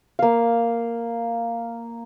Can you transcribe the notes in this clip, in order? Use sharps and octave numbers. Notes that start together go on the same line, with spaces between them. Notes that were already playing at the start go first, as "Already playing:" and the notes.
A#3 F5